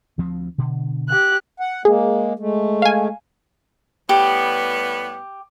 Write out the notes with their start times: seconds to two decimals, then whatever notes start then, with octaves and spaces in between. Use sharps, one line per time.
0.18 D2 F3 C4
0.58 B2 D3
1.09 G4 F#6
1.60 F#5
1.85 G#3 A#3 G#4
2.39 G#3 A3
2.82 F5 G#5
4.09 A2 G3 B3 G4